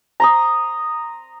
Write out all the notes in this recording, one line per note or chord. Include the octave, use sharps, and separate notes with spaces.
A#5 C6 D#6